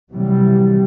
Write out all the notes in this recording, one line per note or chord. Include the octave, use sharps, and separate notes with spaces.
C3 E3 F#3 G3